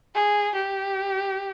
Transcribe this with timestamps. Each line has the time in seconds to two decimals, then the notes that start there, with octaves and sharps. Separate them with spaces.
0.15 G#4
0.55 G4